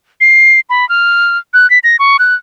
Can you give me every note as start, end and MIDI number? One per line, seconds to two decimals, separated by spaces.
0.21 0.60 96
0.70 0.87 83
0.89 1.37 89
1.54 1.69 90
1.70 1.79 95
1.84 1.96 94
1.99 2.17 85
2.19 2.35 90